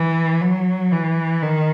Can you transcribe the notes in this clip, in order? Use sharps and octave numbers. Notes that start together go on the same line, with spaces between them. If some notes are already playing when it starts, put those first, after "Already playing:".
Already playing: E3
F#3
E3
D#3